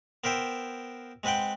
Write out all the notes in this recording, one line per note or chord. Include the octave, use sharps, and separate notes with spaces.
B3 A#4 C5 E5 G5
G#3 C4 B4 F#5 G5